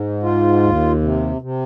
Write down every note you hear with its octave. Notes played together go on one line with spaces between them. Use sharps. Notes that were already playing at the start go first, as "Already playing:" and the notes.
Already playing: G#2
F4
D#2
C3
C3